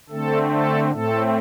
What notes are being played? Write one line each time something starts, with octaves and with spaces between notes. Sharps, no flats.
D3 A3 C4 A4
A4
A2 A3 C4 A4